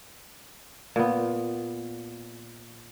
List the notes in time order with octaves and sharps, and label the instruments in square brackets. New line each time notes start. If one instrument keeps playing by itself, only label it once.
[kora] A#2 B3